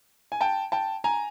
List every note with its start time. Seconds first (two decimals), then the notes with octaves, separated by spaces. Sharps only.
0.32 G#5
0.41 G5 A5
0.72 G5 A5
1.04 G#5 A#5